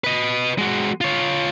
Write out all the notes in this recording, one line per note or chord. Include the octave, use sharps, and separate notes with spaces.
B4 D#5
G#3 F#4
F4 C#5